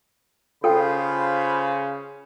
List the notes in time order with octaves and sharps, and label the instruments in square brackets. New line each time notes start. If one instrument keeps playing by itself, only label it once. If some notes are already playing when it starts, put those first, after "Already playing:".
[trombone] C#3 [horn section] F4 C5 B5 [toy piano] A4 G5